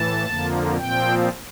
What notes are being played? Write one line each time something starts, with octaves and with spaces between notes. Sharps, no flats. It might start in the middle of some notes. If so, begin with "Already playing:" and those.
Already playing: A2 E3 A5
F2 D3 F3 A#3
A#2 F3 C4 G5